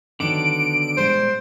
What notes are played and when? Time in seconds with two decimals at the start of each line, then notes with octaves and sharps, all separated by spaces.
0.20 D3 D#3 F#3 B3 D4 D7
0.97 A#2 G3 G#3 C5